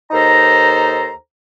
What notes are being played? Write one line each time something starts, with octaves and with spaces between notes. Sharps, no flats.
D#2 D#4 A4 C5 A#5